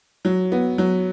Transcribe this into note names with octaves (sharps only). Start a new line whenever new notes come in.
F#3
B3
F#3